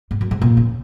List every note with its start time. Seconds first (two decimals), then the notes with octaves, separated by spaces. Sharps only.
0.11 G#2
0.21 F#2
0.31 G#2
0.42 A#2
0.57 C#3